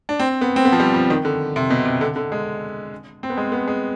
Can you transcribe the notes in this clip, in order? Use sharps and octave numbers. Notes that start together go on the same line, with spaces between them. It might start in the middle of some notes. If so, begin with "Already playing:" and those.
D4
C4
B3
C4
B3
F3
G3
F3
D#3
D3
C3
B2
C3
D3
D3
G#3
C4
B3
G#3
B3
G#3